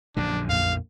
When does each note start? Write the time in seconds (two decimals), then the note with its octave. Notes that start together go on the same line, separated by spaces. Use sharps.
0.17 A#1 F#2 D3 D4
0.49 F2 A#2 A#3 F5